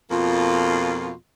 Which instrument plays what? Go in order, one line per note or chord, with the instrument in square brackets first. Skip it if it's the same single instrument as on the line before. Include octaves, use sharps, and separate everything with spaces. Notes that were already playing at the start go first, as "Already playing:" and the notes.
[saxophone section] F2 B2 A#3 F4